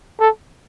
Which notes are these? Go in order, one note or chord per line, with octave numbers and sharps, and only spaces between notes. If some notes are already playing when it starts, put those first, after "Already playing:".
A4